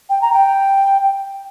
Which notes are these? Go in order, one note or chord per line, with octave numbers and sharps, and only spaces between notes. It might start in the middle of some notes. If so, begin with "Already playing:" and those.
G5
A#5
G5